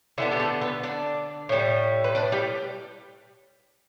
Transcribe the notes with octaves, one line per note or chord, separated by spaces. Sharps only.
D3 G3 B3 D4 E4
G4
A3 A4
B3 B4
D4 D5
A2 E3 G3
B4
D4 D5
G3 G4